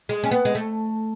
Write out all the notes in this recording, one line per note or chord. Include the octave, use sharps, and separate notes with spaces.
G#3
C#4
B3
G#3
A3